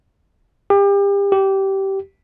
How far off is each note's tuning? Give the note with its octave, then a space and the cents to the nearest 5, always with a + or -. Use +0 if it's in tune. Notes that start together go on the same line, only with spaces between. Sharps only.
G4 +35
G4 -15